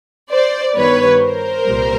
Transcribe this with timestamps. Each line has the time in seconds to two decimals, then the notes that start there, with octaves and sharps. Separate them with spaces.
0.31 C5 D5
0.75 G2 D#3 G3 B3 B4 C#5
1.21 A#4 C5
1.65 C2 A#2 G3